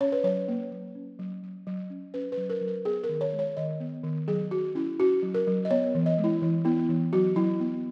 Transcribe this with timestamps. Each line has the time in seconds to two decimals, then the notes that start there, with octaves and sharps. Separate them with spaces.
0.01 C#4 C#5
0.12 B4
0.24 F#3 C#5
0.48 A#3
0.72 F#3
0.95 C#4
1.19 F#3
1.43 F#3
1.67 F#3
1.90 C#4
2.14 C#4 B4
2.32 B4
2.37 F#3
2.50 A#4
2.61 F#3
2.67 A#4
2.85 B3 G#4
3.04 A#4
3.09 D#3
3.21 C#5
3.33 G#3
3.39 C#5
3.57 D#3 D#5
3.80 B3
4.04 D#3
4.28 F#3 G#4
4.51 F#3 F#4
4.75 C#4 E4
5.00 C#4 F#4
5.23 F#3
5.34 A#4
5.47 F#3
5.65 D#5
5.71 B3 C#5
5.95 E3
6.06 D#5
6.18 G#3
6.24 E4
6.42 E3
6.65 B3 E4
6.89 E3
7.13 F#3 F#4
7.36 F#3 E4
7.60 B3